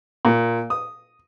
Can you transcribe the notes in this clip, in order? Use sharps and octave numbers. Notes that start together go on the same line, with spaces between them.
A#2
D#6